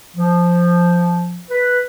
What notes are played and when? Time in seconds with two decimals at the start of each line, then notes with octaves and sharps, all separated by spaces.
0.16 F3
1.50 B4